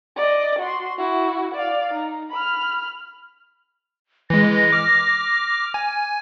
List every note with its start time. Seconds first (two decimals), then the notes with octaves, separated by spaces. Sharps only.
0.17 D5 D#5
0.59 F#4 C6
0.98 E4 F#4
1.55 D5 F5
1.94 D#4
2.30 B5 F6
4.30 E3 G#3 A#6
4.72 D6 F6
5.74 G#5